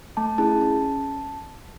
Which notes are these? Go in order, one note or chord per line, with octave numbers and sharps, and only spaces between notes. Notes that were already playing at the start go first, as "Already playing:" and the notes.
A3 A5
C#4 E4 G#4 A5
C#4